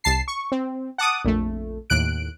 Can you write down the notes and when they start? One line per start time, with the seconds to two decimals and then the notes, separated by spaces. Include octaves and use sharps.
0.04 C2 A5 C7
0.28 C#6
0.52 C4
0.98 F#5 A5 D6 D#6
1.24 A#1 F2 A3
1.90 D#2 A2 F#6 D7